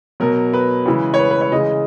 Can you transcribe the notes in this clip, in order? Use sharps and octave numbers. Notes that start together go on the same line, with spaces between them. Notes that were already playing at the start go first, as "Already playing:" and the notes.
B2 F#3 A#4
B4
C#3 E3 G#3
C#5
B4
B4
C#5
C#3 E3 G#3 D#5